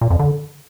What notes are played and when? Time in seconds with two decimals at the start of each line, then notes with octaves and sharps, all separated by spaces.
0.01 A#2
0.10 F2
0.19 D3